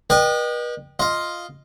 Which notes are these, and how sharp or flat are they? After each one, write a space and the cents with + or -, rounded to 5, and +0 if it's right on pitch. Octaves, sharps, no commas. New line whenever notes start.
B4 -40 D#5 -35 G5 +0
F4 +0 D#5 +5